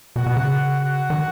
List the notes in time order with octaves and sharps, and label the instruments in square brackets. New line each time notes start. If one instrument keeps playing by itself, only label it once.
[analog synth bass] B2 [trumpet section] F#4 F#5
[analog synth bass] B2
C#3
[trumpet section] F#4 F#5
[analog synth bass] D#3